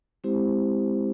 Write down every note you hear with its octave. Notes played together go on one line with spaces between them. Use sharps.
G#3 C4 E4 G4 C5